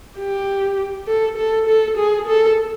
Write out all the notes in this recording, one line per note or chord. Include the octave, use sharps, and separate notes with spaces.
G4
A4
A4
A4
G#4
A4